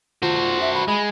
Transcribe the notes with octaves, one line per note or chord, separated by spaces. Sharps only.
F4 F#4 C5
E5
B5
G#3 B5